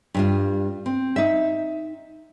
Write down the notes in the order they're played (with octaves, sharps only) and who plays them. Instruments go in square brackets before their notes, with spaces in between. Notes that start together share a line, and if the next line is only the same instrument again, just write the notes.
[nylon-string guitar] G2 G3 F4
C4
D#4 E5